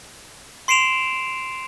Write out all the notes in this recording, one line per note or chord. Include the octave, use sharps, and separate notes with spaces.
C6 C7 D7 E7 F7